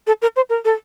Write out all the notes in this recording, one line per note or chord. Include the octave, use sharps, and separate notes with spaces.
A4
A#4
C5
A#4
A4